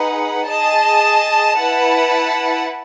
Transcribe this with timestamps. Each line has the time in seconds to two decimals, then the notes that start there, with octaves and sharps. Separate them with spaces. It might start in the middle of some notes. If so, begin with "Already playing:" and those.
Already playing: D#4 G#4 B4 F#5
0.49 G#4 D#5 A5
1.57 E4 B4 F#5 A5